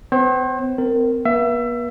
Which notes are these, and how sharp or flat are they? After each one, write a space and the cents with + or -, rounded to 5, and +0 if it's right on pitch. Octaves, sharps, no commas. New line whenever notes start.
C4 -45 C5 +40
C4 -35 A#4 -10
B3 -45 E5 +25